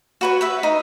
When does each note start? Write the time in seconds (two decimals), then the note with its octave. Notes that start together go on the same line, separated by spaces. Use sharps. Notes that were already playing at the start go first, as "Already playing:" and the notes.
0.21 F#4 B4 C#5
0.41 B4 E5
0.63 D#4